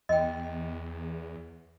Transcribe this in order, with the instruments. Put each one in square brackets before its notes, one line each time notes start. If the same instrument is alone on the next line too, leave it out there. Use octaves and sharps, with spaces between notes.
[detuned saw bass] E2 [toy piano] D#5 G5